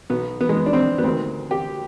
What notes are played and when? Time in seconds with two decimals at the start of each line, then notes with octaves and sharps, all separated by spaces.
0.10 B1 B2 B3
0.41 B3
0.49 G#3
0.56 B3
0.66 D4
0.73 C4
0.98 B3
1.04 D2 C3 D#3 C4
1.51 G4